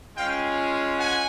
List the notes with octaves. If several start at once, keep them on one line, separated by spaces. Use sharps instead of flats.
G#3 C#4 F4 F5 G5
F#5 G#5